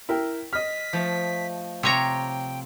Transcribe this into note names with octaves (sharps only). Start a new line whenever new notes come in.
E4 A#4 G5
D#5 F6 B6
F3 A3
C3 C#5 G5 A#5